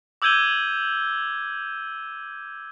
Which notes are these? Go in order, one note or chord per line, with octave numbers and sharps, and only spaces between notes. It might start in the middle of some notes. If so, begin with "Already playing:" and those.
D6 E6 G6 G#6 D#7 G7